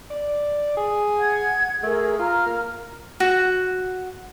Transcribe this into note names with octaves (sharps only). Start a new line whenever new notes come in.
D5
G#4
F#5 G#6
A3 G#4 A#4
F4 A#5 F6
A#3
F#4